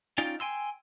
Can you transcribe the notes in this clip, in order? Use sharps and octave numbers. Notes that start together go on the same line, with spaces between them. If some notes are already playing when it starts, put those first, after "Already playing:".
C#4 D#4 F4 D5 G5
G5 G#5 C6 E6